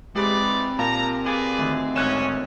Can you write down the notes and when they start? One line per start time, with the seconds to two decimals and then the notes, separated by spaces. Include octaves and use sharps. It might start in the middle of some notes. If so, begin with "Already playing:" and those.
0.16 E3 G#3 C4 D#4 G4 D5 G#5 B5
0.79 A#2 A#4 F5 A5 A#5
1.25 G#4 B4 D5
1.58 D2 D#3
1.96 G#1 C#4 F#6 E7